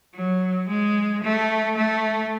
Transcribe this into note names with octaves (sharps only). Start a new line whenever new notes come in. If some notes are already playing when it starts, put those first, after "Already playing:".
F#3
G#3
A3
A3